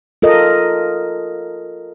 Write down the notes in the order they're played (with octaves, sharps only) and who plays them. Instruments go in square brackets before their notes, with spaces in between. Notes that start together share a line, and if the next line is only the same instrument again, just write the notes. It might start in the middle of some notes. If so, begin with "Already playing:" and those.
[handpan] F4 A4 A#4 D#5